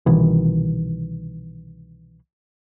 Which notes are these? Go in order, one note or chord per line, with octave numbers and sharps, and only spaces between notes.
C2 B2 D#3 E3